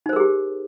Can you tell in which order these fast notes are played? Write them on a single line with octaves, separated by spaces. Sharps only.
D#4 C5 A#4 G#4 G4